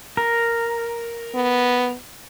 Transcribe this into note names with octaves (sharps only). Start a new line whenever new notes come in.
A#4
B3